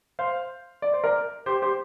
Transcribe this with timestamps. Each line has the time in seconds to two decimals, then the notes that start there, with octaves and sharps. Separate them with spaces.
0.19 C5 F5
0.82 D5
0.93 C5
1.04 A#4 D5
1.46 G4 C5
1.62 G4 C5